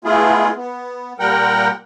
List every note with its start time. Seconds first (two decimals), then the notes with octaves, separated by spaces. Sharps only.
0.05 G#3 A3 B3 E4 F4 G#4
0.57 B3
1.19 A#2 G3 A#4 F#5 G5